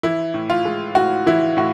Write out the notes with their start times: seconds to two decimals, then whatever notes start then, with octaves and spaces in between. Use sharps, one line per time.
0.03 E3 E4
0.34 A2
0.50 F4
0.65 G#3
0.95 A2 F#4
1.26 E3 E4
1.57 A2 F#4